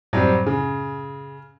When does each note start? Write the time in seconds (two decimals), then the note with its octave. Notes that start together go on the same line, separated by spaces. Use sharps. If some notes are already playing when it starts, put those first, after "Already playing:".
0.13 F#2 A2 F#3 G3 C4
0.47 C#3